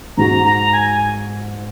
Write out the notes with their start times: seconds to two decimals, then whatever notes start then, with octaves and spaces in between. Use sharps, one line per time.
0.17 G#2 G#3 F#4 A#5
0.45 A#5
0.73 G#5